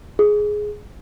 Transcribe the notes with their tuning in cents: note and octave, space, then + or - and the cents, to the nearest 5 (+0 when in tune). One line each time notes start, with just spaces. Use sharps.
G#4 +5